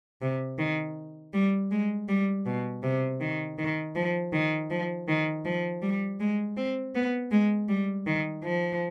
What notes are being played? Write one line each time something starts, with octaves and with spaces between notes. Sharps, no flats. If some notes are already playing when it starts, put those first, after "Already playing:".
C3
D#3
G3
G#3
G3
B2
C3
D#3
D#3
F3
D#3
F3
D#3
F3
G3
G#3
C4
B3
G#3
G3
D#3
F3